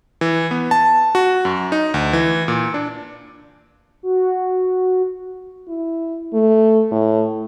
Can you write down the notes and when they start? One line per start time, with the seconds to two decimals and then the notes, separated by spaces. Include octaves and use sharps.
0.21 E3
0.51 B3
0.71 A5
1.15 F#4
1.45 F#2
1.72 D#4
1.94 D2
2.13 E3
2.48 A#2
2.74 D4
4.03 F#4
5.68 E4
6.33 A3
6.91 A2